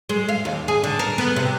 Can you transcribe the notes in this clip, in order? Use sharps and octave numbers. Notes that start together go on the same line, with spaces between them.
G#3
F5
D#2
G#4
D3
A#4
B3
C3